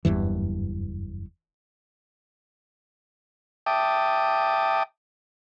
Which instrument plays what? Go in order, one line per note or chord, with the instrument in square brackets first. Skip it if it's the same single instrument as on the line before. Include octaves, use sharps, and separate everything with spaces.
[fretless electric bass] F#1 E2 G2 E3
[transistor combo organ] E5 G5 A5 D6 D#6